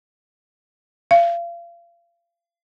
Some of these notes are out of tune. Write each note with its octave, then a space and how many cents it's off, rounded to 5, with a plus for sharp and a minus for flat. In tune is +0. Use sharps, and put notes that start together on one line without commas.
F5 -35